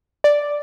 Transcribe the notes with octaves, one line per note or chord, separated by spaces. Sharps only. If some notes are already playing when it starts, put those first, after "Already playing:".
D5